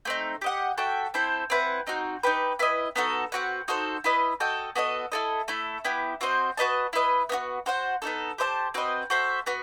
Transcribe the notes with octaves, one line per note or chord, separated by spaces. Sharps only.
A3 C4 D#4
G4 D#5 F#5
F#4 A4 E5 G5
C4 E4 A4 C5
C4 E4 B4 F#5
C4 D#4 F#4
D#4 G4 B4
E4 B4 D#5
B3 D#4 F#4 A4
C4 F#4 B4 F#5
D#4 F#4 A4 C5
E4 B4 D#5
F#4 A4 D#5 G5
B3 F#4 A4 D#5
E4 A4 D#5
A3 E4 A4
B3 E4 G4
C4 F#4 C5 D#5
F#4 B4 D#5 A5
E4 B4 D#5
B3 D#4 F#4
F#4 C5 F#5
B3 D#4 F#4 A4
G4 C5 E5 A5
C4 F#4 B4 D#5
F#4 A4 C5 E5
B3 F#4